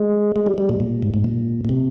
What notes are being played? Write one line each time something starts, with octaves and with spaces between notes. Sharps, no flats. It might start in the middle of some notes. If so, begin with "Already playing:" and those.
Already playing: G#3
G#3
G3
G3
A#2
A#2
G#2
G#2
A#2
A#2
C3